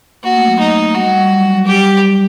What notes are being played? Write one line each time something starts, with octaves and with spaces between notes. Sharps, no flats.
A#3 F#4
A3
F#3
D#4
G3 F#4
G3
F#3
G3
F#3
G3 G4
G3
G3